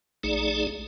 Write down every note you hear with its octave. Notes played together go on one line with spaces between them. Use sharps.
A#1 A3 D#4 G#4 D5